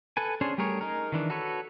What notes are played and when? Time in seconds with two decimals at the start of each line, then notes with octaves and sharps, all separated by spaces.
0.17 A4 B4 G#5
0.41 C#4 D4 G#4 C5
0.58 G3 A3 G#4 A#4 C#5
0.81 D#4 G#4 A#4
1.12 D#3 E3 D4
1.30 F#4 A4 B4 C#5